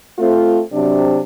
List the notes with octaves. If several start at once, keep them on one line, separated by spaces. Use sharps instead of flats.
A3 C4 F4
C3 F#3 D4